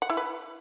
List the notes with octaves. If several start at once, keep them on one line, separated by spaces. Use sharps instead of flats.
F#5
E4
B4